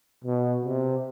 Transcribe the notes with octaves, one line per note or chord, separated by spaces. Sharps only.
B2
C3